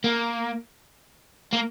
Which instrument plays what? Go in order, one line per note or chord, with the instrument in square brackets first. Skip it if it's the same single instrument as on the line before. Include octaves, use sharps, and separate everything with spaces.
[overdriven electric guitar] A#3
A#3